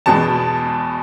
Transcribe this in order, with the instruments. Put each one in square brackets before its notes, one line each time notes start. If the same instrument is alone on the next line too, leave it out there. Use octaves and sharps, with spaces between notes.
[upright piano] E2 B2 G#3 A5